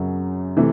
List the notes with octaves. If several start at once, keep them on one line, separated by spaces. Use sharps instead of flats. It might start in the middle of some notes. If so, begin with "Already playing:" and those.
Already playing: F#2 C#3 F#3
C3 E3 A3